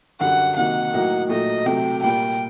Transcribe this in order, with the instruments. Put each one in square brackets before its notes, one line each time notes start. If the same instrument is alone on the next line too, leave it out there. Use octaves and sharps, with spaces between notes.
[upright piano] F#2 D3 G3 D4 [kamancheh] F#5
[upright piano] C3 D#3 F#3 A#3 D#4 [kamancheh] F#5
[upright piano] A2 F#3 A#3 D#4
[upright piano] A#2 F#3 A3 D#4 [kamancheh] D#5
[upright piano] C3 F#3 A3 [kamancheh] G5
[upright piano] A#2 G3 A#3 [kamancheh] G5